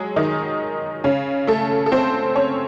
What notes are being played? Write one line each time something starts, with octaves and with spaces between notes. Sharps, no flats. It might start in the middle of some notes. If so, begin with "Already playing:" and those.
Already playing: F#3 G#3 G#4
D#3 D#4
C#3 C#4
A3 A4
A4
C4 C5
C#4 C#5